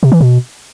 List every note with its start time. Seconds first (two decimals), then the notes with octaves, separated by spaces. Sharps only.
0.03 C3
0.12 E3
0.21 B2